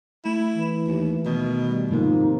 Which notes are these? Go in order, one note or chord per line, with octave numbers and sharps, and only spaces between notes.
A3 E4
E3
D#2
B2 D#3
G3
G#2 C3 F3 A#3 D#4